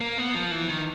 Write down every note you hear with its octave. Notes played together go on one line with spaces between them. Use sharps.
A#3
B3
F3
E3
D#3